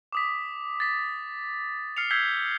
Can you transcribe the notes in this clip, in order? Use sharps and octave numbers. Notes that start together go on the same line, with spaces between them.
D6 D#6 B6
A6 B6
F6 C7 C#7 F7
E6 G6 G#6 B6 C7 G7